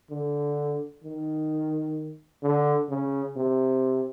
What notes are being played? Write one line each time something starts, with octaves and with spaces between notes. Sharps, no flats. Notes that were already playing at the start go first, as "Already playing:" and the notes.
D3
D#3
D3
C#3
C3